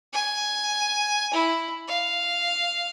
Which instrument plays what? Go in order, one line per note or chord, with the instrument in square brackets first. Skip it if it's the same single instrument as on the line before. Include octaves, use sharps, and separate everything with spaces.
[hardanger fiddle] G#5
E4
F5